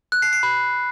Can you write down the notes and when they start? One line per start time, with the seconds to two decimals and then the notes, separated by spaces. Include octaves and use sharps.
0.12 F#6
0.22 C7
0.33 C7
0.43 B5